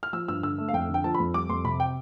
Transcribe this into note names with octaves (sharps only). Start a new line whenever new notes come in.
F6
F3 E6
G2 E6
D3 E6
A3
F5
F2 G5
D3
G5
F3 A5
B5
F2
G3 D6
F2 C6
C3 B5
G5